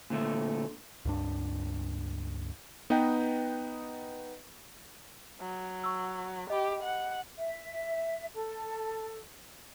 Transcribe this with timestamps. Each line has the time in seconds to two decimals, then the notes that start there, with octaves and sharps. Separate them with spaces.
0.10 A#2 D3 A3
1.05 C#2 G2 D4
2.90 B3 D#4 B4 D#5 G5
5.40 F#3
5.84 C#6 E6
6.50 G4 D#5 B5
6.83 F#5
7.37 E5
8.33 A4